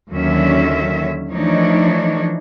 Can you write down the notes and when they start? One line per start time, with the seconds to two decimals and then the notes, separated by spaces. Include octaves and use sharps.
0.11 D#2 D3 D#3 F#3 C#4 E5
1.32 E3 F3 A3 D4 D#4 C#5